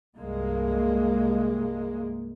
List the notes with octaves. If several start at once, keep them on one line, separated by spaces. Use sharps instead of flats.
C2 G2 G#3 A#3